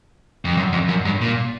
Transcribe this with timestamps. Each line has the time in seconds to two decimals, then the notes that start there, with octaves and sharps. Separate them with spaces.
0.45 F2
0.57 F#2
0.72 F2
0.89 F#2
1.05 G2
1.21 A#2